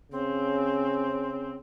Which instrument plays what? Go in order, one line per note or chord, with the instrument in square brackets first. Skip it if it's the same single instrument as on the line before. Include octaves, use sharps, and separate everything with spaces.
[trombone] C#3 [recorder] C4